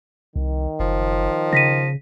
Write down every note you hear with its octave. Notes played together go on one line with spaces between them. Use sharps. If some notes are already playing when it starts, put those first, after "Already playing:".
C2 D#3
F#1 F3
C#3 A#6 B6 D#7